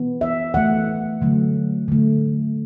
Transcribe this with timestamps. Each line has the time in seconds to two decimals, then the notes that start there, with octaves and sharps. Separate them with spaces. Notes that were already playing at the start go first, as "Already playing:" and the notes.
Already playing: E3 B3
0.21 E5
0.54 E3 A3 F#5
1.21 D3 F#3 A3
1.88 D3 A3